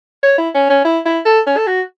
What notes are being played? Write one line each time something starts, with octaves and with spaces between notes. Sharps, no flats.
C#5
E4
C#4
C#4
E4
E4
A4
C#4
A4
F#4